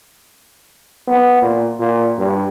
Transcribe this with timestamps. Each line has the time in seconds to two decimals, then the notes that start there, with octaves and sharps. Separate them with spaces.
1.07 B3
1.42 A#2
1.79 A#2
2.18 G2